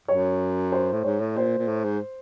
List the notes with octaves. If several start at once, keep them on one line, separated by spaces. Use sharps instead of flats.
F#2 C#5
C5
A2
G#2 C#5
A2
A#2 C5
A#2
A2
G#2